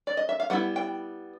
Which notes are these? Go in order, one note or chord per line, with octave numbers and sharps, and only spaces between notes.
D5
D#5
E5
F5
G3 B3 E4 F#5
G5